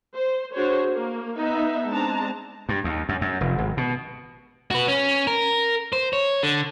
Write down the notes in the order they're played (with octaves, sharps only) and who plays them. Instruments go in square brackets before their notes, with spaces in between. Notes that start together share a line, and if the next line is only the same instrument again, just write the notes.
[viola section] C5
D4 F#4 G#4 C5 C#5
A#3
B3 D#4 E5
G#3 C4 D4 A5 A#5
[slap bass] G2
D#2
F#2
F#2
F1
G#1
B2
[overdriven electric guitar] F#4 B4
C#4
A#4
C5
C#5
D3